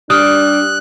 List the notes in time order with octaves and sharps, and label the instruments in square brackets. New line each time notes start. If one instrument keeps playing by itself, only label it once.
[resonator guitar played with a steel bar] G3 [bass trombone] D4 [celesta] D#6 F6 [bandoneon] F#6